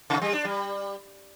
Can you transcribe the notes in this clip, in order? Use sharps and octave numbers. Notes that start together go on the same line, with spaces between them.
C3
G3
D4
G3